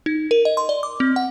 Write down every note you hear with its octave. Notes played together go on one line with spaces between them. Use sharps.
D#4
A#4
D#5
C6
D5
D6
C4
F#5